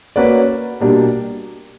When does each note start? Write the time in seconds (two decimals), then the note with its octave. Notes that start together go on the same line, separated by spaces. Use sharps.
0.16 A#3 C#4 F#4 B4 D5
0.81 B2 G3 A#3 D4 G4